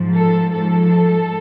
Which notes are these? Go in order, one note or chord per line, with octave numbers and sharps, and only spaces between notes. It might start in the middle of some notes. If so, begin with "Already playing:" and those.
Already playing: G#2 F3
A4
G#2 F3 A4